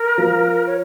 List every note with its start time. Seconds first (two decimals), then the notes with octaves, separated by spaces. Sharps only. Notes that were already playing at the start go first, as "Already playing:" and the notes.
Already playing: A#4
0.18 F3
0.66 C#5